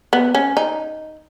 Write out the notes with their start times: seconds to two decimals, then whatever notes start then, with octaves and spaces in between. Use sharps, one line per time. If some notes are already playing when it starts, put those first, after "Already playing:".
0.13 B3
0.35 C#4
0.57 D#4